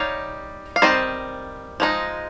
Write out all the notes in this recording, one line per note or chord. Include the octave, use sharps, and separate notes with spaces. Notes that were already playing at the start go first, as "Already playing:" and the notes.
Already playing: G3 D#4 C#5 F5
F5
D#3 G3 C4 C5 D#5
F3 G#3 D#4